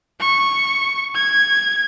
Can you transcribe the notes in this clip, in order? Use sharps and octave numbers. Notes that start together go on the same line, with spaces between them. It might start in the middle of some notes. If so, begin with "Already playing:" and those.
C#6
G#6